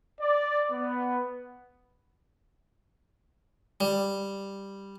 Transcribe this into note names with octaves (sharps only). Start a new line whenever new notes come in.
D5
B3
G3